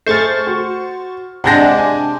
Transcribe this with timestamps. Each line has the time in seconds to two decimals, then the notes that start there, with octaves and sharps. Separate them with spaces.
0.06 A3 G#4 C5 C#6 F6 A6
0.47 F#4
1.44 C3 G#3 D4 F#5 G6 A#6
1.78 G#5